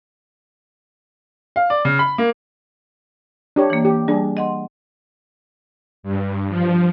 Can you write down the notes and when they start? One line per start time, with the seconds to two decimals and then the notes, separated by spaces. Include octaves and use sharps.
1.56 F5
1.70 D5
1.85 C#3
1.99 B5
2.18 A#3
3.56 D4 G4 C#5
3.70 E3 A#3
3.85 G4
4.08 G3 D4 G#4
4.37 D#5 F#5 C6
6.03 G2
6.49 F3